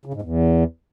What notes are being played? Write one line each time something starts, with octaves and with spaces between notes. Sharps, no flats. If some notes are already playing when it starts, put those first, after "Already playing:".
C#3
G#2
E2